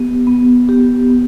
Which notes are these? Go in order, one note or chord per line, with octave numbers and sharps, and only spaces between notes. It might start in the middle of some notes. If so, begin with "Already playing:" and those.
Already playing: B3 G4
B3
G4
B3